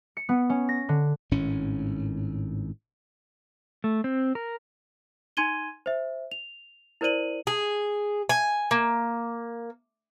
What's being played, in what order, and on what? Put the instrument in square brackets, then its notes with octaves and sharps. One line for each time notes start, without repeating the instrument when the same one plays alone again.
[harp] C#7
B3
C#4
A#6
D3
[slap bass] G#1 A2 C#4
[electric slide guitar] A3
C4
A#4
[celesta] D#4 G#5 C6 G#6 D#7 G7
C5 E5
F7
E4 A#4 C5 D5 D#7 F#7
[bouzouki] G#4
G#5
A#3